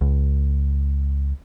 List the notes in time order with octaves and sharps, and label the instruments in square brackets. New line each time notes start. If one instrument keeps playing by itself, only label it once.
[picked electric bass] C#2